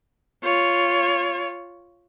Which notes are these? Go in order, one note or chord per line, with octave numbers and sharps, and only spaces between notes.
F4 C#5